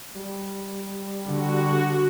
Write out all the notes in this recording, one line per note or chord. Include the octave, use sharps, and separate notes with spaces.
G3
D3 F#4